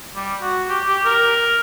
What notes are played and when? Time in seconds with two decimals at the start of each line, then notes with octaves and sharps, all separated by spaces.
0.15 G3
0.42 F#4
0.69 G4
0.87 G4
1.05 A#4